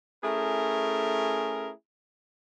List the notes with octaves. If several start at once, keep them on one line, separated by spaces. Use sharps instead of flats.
A3 C#4 E4 G#4 A#4